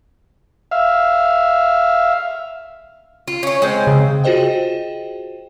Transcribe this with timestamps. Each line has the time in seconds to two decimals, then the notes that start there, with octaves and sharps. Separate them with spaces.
0.71 E5 F5
3.27 F4
3.43 C#4 C#5
3.62 G#3 C4
3.87 C#3
4.24 F4 F#4 G#4 C5 D#5 G5